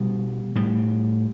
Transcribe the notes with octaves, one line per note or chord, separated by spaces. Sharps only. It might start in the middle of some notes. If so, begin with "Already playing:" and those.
Already playing: B2 G3
A2 G3